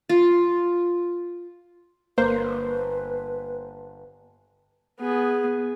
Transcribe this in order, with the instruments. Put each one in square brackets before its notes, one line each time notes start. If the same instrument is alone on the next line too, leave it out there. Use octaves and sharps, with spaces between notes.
[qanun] F4
[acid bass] G1 [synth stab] A#3 C5 [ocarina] B4
[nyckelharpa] B3 G#4